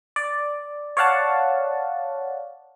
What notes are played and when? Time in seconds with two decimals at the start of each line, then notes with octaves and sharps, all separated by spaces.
0.16 D5
0.97 C#5 D5 F5 F#5 A5